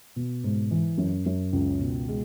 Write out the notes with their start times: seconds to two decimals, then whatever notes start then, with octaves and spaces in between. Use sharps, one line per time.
0.16 B2
0.44 G#2
0.71 E3
0.98 F#2
1.26 F#2
1.53 C#2
1.81 B2
2.09 G#3